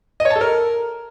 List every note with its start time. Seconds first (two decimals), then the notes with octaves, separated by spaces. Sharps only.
0.20 D#5
0.25 C#5
0.30 A5
0.36 A4
0.41 A#4